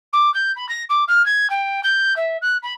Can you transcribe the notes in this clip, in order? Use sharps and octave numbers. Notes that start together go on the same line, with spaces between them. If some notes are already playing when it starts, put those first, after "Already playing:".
D6
G6
B5
A#6
D6
F6
G#6
G5
G6
E5
F#6
B5